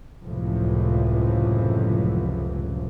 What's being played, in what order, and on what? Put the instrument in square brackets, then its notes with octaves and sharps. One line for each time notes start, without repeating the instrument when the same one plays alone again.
[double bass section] C#2 F#2 A2 C3 E3 F3